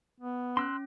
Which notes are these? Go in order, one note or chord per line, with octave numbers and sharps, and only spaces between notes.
B3
C#4 C6 E6 F#6